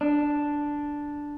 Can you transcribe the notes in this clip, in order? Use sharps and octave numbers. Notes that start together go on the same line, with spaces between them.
D4